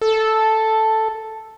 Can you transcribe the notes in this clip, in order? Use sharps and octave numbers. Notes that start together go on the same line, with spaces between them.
A4